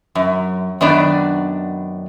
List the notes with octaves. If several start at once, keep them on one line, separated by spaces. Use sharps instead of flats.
F#2
F#2 D#3 B3 D4 D5